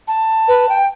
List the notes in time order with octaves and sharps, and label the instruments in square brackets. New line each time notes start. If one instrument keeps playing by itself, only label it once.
[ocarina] A5
[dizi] B4
G5